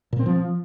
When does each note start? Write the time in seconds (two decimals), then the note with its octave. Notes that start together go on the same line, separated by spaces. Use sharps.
0.13 A#2
0.19 C4
0.26 F3